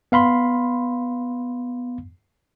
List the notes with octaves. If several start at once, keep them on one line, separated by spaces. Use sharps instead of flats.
B3 F5 B5 C6